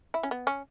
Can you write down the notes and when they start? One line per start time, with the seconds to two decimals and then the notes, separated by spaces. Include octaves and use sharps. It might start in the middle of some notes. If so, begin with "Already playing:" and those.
0.14 E4
0.23 C#4
0.31 B3
0.47 C#4